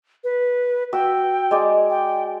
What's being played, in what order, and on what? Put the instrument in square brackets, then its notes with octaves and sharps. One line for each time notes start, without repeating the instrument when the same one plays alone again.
[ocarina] B4
[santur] F#4 E6 [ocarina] G5
[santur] G#3 D5
[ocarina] G5